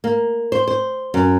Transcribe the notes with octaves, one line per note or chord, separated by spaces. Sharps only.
A#3
C5
C5
F#2